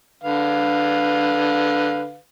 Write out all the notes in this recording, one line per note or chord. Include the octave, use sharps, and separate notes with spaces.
D3 B4 F5